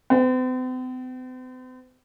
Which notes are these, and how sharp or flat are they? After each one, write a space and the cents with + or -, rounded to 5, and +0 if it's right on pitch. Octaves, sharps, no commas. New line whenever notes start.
C4 -45